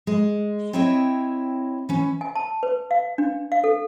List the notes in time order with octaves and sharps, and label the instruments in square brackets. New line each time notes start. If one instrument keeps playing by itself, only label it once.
[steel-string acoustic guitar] G#3
C4 E4 C#5 D#5 E5 G5
E3 C#4
[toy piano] G#5
A5
B4
F5
D4
F5
A4